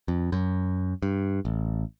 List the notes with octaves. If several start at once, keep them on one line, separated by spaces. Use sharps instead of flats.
F2
F#2
G2
A1